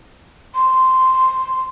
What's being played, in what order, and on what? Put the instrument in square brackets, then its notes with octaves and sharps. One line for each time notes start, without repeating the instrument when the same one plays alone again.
[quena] C6